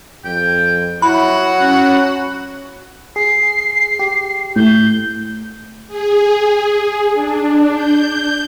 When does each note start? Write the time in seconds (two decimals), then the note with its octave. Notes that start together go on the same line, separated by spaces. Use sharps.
0.25 F2 G5
1.02 F#3 E4 F#4 B5
1.61 C#4
3.16 G#4 C7
3.99 G4
4.56 A2 G6
5.88 G#4
7.14 D4
7.73 G6